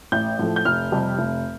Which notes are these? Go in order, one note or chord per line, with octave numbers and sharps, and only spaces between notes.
A1 G6
A2 F3 A3
G6
F1 F6
F2 C3 G3
F1